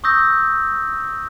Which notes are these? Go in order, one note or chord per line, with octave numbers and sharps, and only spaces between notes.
C#6 D#6 E6 G6 A#6